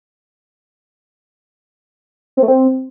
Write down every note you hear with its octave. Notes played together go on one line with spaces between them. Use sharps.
C4
A3
C4